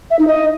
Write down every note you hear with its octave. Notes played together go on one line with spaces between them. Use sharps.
E5
D#4
D#5